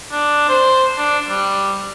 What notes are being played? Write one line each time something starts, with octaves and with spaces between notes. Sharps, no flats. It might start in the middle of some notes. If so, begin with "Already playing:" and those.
D4
C5
D4
G3